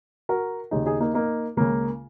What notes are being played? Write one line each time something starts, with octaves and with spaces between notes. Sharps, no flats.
F#4 A#4
D#2 C#3 D#4 G#4
D#4 G#4
A#3 D#4
A#3 D#4
C#2 C#3 A#3